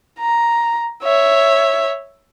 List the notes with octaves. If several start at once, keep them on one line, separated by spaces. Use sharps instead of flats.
A#5
C#5 E5